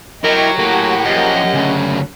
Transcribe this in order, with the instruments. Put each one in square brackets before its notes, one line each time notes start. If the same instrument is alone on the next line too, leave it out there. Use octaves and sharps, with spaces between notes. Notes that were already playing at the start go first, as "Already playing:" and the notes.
[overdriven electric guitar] F#3 [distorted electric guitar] E4 G4 [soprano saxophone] A#4 [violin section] D#5 G5 C#6
[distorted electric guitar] A2 [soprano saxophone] A#3 [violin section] G4 G#4 F#5
[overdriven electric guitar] F#2 [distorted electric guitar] F3 A#3 [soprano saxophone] D#5
[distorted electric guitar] D2 C#3